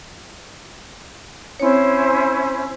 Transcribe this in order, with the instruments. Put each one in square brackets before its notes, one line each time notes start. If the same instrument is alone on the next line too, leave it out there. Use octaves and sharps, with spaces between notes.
[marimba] C4 C#5 [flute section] C#4 E4 C5